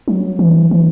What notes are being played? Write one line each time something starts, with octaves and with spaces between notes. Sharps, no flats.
F#3
E3
E3